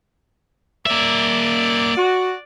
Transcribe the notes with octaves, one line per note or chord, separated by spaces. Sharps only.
A#3 D5 E5
F#4